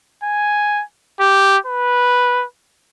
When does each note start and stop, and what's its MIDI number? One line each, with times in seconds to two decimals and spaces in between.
0.23 0.83 80
1.20 1.58 67
1.66 2.45 71